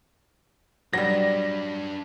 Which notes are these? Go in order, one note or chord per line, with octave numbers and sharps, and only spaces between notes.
F#3 G3 D4 B4 A#6